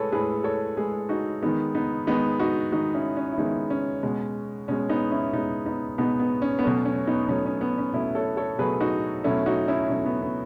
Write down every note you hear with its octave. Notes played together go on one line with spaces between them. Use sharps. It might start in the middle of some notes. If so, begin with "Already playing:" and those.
Already playing: A2 G#3 G#4 A4 B4 C#5
A2 G#3 G#4 B4
A4 C#5
A2 G#3 G#4 B4
D#4 F#4
D#3 G#3 B3 D#4
B3 D#4
D#3 G#3 B3 D#4
D#4 F#4
D#3 G#3 D#4 F#4
C#4 E4
C#4
E4
D#3 G#3 B3 D#4
C#4
B2 G#3
B2 G#3 C#4
B3 D#4
C#4 E4
B2 G#3 B3 D#4
B3 D#4
B2 G#3 B3 D#4
B3
C#4
B3
B2 F#3 A3 C#4
C#4
B3 D#4
B2 F#3 A3 C#4
C#4
B3
C#4
B2 F#3 A3 C#4 E4
A4 C#5
A4 C#5
B2 F#3 A3 G#4 B4
D#4 F#4
B2 F#3 A3 C#4 E4
D#4 F#4
C#4 E4
B2 F#3 A3 C#4
B3
B3